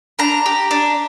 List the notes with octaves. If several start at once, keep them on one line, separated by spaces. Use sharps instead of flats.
D4 A#5
G4
D4